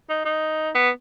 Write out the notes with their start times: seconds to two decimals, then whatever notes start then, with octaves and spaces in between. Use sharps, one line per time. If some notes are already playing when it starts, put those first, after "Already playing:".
0.09 D#4
0.25 D#4
0.75 B3